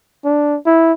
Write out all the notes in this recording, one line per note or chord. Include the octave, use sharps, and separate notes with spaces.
D4
E4